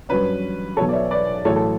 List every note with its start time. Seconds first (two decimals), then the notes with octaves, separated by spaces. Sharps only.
0.09 G2 F#3 C#4 B4
0.77 B1 B2 F#3 B3 A4 C#5
0.89 D5
0.93 C#5 E5
1.11 B4 D5
1.45 A1 A2 F#3 A4 C#5
1.56 A4